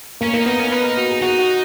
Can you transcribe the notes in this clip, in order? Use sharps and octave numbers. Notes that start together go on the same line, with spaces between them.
A#3 C#4
A#3 D#4
B3 D#4
C#4 A#4
D#4 B4
A#4
F#4
G#4
D#4 F#4
F#4